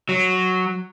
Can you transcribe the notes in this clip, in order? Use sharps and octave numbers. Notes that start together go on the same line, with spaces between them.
F#3